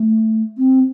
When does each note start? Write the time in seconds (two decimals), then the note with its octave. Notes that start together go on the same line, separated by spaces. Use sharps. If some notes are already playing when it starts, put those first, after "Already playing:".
Already playing: A3
0.58 C4